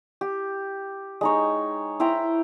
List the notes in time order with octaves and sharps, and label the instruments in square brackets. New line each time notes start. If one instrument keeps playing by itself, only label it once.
[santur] G4
G#3 D#4 C#5
E4 C5 G5 A#5